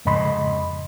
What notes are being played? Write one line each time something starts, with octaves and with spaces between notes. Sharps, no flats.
F2 G#2 C#3 D#5 B5 C6